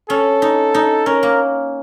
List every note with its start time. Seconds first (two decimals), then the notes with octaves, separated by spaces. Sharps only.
0.09 C#4 A4
0.42 D#4
0.74 D#4
1.06 C#4 A#4
1.23 A#3